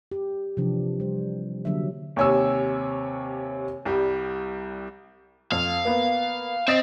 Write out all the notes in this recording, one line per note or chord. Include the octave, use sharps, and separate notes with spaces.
G4
C3 E3 F3 D4
G3 C5
D3 F#3 A#3 D4 E5
D#2 C3 C#5 G#5 E6
C2 G3
F2 F5
A#3 B3
C4 D#5 A6